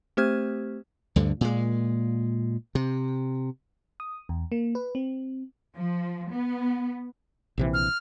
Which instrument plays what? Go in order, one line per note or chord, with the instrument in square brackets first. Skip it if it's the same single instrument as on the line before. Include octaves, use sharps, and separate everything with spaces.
[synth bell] A3 C4 G4 C5 F6 G#6
[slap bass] D2 G2 D3
A#2 G#3
C3
[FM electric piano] D#6
E2
A#3
B4
C4
[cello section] F3
B3
[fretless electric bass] A#1 C3 E3
[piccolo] F6